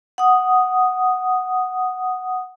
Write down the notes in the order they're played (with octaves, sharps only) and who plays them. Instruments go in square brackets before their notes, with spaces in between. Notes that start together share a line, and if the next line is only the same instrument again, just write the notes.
[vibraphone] F#5 D#6